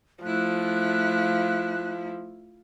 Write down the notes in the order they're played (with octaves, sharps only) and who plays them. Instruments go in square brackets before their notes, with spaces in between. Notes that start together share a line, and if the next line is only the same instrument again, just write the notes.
[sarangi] F3 [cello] A3 E4 [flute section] F#6